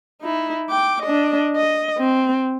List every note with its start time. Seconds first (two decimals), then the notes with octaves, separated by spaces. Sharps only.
0.21 D#4 E4
0.70 G5 D6
1.02 D4 D#5
1.57 D#5
1.98 C4